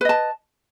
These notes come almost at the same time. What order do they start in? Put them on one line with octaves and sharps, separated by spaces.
B4 D#5 A5